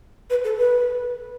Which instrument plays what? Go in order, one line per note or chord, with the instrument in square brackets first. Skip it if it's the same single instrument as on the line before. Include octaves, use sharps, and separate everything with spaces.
[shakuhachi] B4
A4
B4